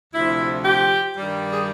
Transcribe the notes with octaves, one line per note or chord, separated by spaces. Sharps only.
D2 C3 F3 E4
G4
G2 D#3 G3
G#4